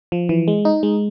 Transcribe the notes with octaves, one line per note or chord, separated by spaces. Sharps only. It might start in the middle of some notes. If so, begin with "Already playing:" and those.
F3
E3
G#3
D#4
G#3